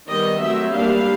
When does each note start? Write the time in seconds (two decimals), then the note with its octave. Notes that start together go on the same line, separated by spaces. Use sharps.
0.09 D#3 G3 B3 D#5
0.42 F#3 A3 C4 E5
0.74 G3 A#3 D4 F5